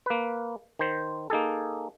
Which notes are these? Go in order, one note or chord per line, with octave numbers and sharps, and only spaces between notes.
A#3 B4
D#3 C5
A#3 D#4 G#4 A4